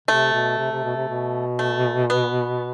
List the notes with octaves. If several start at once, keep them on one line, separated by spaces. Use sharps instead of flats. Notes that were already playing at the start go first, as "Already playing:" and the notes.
C3 A3
B2
C3
C3
B2
C3
B2
A3
B3